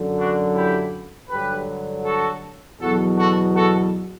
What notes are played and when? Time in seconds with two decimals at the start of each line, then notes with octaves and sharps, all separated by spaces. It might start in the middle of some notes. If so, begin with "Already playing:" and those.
Already playing: F#2 D3 F#3
0.18 D4 F#4
0.55 E4 G4
1.30 G2 D3 F#3 G4 B4
2.05 F#4 A4
2.80 E2 B2 F#3 F#4 A4
3.18 F#4 A4
3.55 F#4 A4